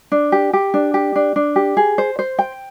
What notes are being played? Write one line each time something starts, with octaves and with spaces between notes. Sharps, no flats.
D4
G4
G4
D4
G4
D4
D4
G4
G#4
C5
C5
G5